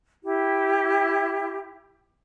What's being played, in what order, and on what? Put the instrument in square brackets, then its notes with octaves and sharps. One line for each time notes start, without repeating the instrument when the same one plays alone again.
[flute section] E4 G4